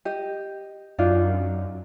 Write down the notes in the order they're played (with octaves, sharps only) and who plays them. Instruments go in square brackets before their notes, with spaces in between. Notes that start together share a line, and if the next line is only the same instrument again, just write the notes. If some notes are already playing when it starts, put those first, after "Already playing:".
[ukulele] G4 D#5
[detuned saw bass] F#2 [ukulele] D4 D#4 F4